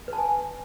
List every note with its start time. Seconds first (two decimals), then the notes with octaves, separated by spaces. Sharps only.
0.08 B4
0.13 A5
0.18 G#5